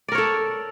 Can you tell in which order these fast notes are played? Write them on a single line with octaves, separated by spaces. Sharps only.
D5 A#4 C#5 A4